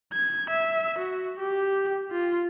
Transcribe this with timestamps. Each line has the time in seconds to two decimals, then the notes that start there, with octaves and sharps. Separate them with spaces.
0.14 G#6
0.50 E5
0.99 F#4
1.40 G4
2.12 F4